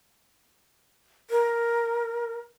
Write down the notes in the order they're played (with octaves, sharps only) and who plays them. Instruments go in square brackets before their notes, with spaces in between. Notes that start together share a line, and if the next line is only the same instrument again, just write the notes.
[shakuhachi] A#4